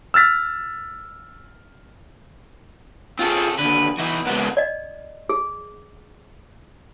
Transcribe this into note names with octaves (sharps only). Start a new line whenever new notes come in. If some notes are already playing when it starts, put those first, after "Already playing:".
E6 F6 A6 B6
C4 C#4 F4 G#4 A4
D#2 D3 B4
E3 B3 D#4 F#4
C#3 G#3 A#3 B3 F#4
D5 D#5
G#4